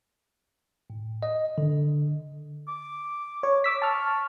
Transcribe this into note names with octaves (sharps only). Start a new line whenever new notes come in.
A2
D#5
D3
D6
C#5
D6 E6 B6
A5 C#6 F6